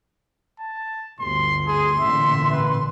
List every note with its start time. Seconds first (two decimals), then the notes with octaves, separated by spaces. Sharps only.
0.59 A5
1.20 G1 D2 C6
1.67 G#4 C6
2.00 A1 A#2 D3 E5
2.52 B4